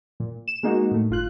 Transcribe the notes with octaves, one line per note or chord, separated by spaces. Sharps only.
A#2
E7
G#3 A#3 D#4 F#4
A2 A3
G1 F4 F#6